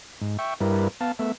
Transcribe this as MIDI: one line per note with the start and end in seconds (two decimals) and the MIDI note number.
0.21 0.37 44
0.39 0.54 76
0.39 0.54 79
0.39 0.54 85
0.61 0.88 43
0.61 0.88 55
0.61 0.88 64
0.61 0.88 70
0.61 0.88 71
1.01 1.12 59
1.01 1.12 77
1.01 1.12 81
1.19 1.32 57
1.19 1.32 59
1.19 1.32 76